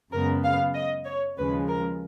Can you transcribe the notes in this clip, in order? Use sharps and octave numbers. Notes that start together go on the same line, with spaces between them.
F#2 C#3 G#3 B3 A#4
F5
D#5
C#5
D#2 C#3 F3 G#3 B4
A#4